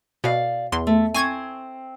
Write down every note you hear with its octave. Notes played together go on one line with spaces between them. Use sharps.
B2 D5 F5
E2 C6
A3
C4 G#5 C#6 G#6